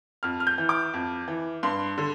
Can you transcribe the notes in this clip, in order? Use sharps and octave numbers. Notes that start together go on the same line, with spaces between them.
F2 F6
F6
G6
E3
D6
F2
E3
G2 C6
D3